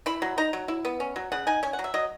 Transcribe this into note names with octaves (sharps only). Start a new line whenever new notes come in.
E4 B5
F#3
D#4 A#5
F#3
E4
B3
C#4
F#3
C#3 F#5
D#4 G#5
C#4 G#5
F#5
F#3
E5
F#3 D#5